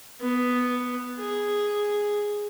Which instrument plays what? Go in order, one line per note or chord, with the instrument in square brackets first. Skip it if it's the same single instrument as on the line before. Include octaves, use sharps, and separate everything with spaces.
[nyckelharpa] B3
G#4